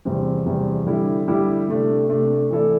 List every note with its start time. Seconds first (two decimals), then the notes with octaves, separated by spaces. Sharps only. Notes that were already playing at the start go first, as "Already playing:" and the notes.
0.05 E2 C3 G3 C4
0.46 E2 C3 G3 C4
0.87 D3 G3 E4 G4
1.28 D3 G3 E4 G4
1.69 C3 A3 D4
2.09 C3 A3 D4
2.50 E3 A3 E4 A4 D5